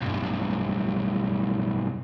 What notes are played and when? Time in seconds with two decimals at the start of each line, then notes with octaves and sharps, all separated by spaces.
0.02 B1 G2